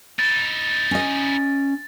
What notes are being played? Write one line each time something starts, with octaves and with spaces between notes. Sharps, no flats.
D#4 E4 A6
C#4 D#5